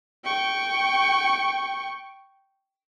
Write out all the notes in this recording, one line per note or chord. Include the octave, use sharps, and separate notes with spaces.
G5 C#6